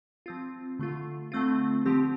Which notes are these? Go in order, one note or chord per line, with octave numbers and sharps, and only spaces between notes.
F3 C4 F4
D3 A3 F4
D3 A3 C4 F4
D3 F3 C4 G4